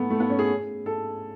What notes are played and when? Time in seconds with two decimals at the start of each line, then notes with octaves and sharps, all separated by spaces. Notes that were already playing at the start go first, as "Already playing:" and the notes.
Already playing: A3 B3
0.10 A3
0.20 B3
0.30 C#4
0.39 G#4
0.86 A4